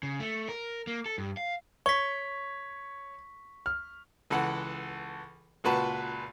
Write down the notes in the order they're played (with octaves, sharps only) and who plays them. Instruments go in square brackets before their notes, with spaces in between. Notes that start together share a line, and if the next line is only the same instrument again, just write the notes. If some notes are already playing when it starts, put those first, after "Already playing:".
[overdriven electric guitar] C#3
A3
A#4
A#3
A4
G2
F5
[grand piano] C#5 [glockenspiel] C#6 B6
[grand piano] F6
[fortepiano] C#2 E3 A4 F#5
C#2 A#2 F#4 B4 A5